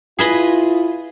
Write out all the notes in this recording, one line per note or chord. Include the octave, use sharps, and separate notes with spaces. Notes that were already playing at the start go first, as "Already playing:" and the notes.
E4 F4 G#4 B4 D#5